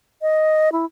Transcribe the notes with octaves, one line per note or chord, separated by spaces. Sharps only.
D#5
E4